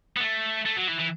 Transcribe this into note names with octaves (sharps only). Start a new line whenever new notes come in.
B3
A3
A3
F#3
E3
E3